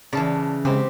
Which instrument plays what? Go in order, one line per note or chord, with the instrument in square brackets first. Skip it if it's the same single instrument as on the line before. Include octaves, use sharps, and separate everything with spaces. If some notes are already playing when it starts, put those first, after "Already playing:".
[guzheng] C#3 E3 [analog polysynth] D5 A5
[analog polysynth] C#3 G#3 [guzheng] B3 C4 G4